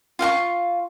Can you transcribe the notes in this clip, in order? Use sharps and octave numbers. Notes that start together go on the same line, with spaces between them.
F4 F5 F#5 C#6